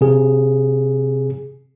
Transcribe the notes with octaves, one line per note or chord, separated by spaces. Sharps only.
C3 G#4